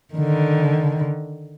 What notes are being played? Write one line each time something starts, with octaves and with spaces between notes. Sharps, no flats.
D3 D#3